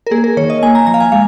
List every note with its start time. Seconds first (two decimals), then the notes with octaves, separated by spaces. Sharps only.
0.07 A#4
0.11 A#3 G#4
0.24 A#4
0.37 D#3 C#5
0.50 D#5
0.63 A#3 G#5
0.75 A#5
0.87 F3 A#5
0.94 F5
1.00 G#5
1.12 G#3 F5